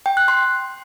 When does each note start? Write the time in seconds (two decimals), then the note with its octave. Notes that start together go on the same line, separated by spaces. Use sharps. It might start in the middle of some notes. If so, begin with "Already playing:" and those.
0.06 G5
0.17 F#6
0.28 C6